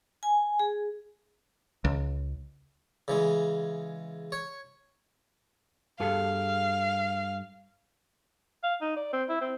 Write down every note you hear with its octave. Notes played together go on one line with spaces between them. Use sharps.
G#5
G#4
C#2
C#3 E3 G#3
C#5
G2 G#4 A4 F5
F5
D#4
D5
C4
E4
C4